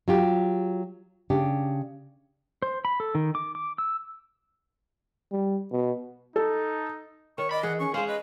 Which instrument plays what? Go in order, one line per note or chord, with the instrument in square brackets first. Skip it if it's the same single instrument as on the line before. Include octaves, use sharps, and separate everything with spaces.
[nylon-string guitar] F#3 F4 G4
C#3 D4 G4
[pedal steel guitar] C5
B5
A4
D#3
D6
D6
E6
[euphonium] G3
B2
[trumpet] D#4 [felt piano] A4
[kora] D#3 [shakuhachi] C#5 [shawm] C#6
[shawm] D5 [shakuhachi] D#5 [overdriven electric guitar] B5
[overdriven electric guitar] E3 [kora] G#4 [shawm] F#5
[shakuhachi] C#4 [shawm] C#6
[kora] G#3 C#4 [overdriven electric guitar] G#4 [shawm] C5 [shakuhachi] F5
[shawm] B4 [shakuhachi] D#5